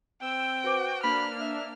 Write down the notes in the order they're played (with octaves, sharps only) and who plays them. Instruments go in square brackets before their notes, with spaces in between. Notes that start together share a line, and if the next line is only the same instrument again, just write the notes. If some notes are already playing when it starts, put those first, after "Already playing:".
[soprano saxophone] C4 [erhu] G5 [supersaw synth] E6
[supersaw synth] F#4 [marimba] B4 C5 D6
[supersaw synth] A#3 D4 [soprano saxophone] B5 [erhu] F6
[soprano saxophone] E5